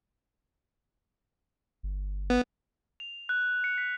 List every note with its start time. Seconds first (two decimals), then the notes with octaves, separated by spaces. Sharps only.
1.83 G1
2.30 B3
3.00 F7
3.29 F#6
3.64 C#7
3.78 B6